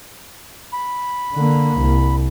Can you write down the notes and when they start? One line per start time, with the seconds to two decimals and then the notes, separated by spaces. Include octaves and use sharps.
0.73 B5
1.34 D3 A#3
1.79 C2